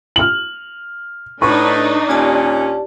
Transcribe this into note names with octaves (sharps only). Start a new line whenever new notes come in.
F6 F#7
A2 D4 D#4 B4 C#6
D#2 A#2 C#4 G4 D5 A5